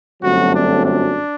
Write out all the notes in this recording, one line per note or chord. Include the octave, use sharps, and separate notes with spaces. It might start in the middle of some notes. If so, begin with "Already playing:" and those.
G1 F#2 F#3 A3 C4 F#4
D4
D4